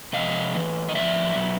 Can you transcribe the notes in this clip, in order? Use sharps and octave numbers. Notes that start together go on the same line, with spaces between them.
C3 F3 D#5 F5
A2 E3
D#5
A2 F3 D5 E5
B2 F#3